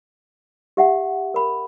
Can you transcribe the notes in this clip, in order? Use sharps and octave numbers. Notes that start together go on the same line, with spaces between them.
G4 E5 F#5
A#4 B5